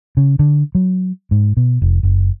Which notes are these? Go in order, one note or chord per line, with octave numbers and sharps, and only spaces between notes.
C#3
D3
F#3
G#2
B2
F1
F#1